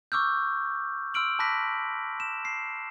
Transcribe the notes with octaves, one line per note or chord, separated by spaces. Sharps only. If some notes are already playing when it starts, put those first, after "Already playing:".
C#6 D6 E6 F6 G6
C6 E6 F6 D7 F#7
A5 B5 D6 F#6 A#6 B6
E7
C7